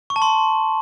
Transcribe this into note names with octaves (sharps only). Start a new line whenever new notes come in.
C#6
A5
C6